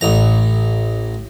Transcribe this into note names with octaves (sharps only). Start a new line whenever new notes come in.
A1 A#5